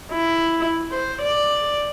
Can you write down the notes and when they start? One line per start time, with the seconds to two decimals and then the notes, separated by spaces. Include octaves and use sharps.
0.12 E4
0.91 C5
1.22 D5